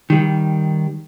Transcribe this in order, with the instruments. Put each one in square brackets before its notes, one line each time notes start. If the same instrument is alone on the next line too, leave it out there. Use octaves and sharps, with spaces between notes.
[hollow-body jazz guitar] D#3 G3